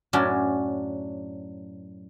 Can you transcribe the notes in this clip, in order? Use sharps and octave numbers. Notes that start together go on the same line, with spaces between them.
F#2 A2 C#4 D4 F#4